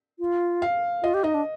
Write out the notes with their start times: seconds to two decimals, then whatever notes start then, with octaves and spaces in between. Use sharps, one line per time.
0.19 F4
0.62 F5
1.03 F4 D#5
1.14 G4
1.24 D#4 D#5
1.34 D4